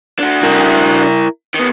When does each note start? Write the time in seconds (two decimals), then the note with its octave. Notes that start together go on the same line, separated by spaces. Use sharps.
0.19 D4 F#4
0.43 E4 A#4
1.54 D#3 B3